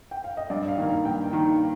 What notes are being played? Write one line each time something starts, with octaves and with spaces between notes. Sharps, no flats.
G5
F5
D#5
G2 D5
F5
D#3 A#3
F5
G2 G5
D#3 A#3